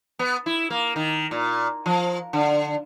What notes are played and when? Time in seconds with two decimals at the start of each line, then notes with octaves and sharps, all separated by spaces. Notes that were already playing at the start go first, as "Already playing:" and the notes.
0.19 B3
0.46 E4
0.70 A#3
0.96 D#3
1.31 A#2
1.86 F3
2.33 D3